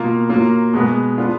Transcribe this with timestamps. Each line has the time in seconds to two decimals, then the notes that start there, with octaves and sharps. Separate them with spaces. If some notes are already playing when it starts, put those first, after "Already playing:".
Already playing: B2 A#3 F4
0.29 F#3 A#3 F4
0.73 B2 G#3 B3
1.18 B3 D4 F4